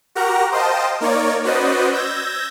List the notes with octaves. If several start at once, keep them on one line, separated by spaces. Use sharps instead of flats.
F#4 G4 A#4 F#5 A#5
C5 D#5 F5 G5 A5
A#3 D#4 A#4 C#5 D5
C#4 F#4 B4 C5 D5 D#5
E6 G6 G#6 A#6